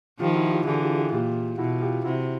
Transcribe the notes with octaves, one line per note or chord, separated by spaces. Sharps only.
D#3 F3 F4 G4
E4 F#4
F4 G4
D3 E3 F#4 G#4
F4 G4
F#4 G#4
A#2 F4 G4
B2 E4 F#4
F4 G4
C3 E4 F#4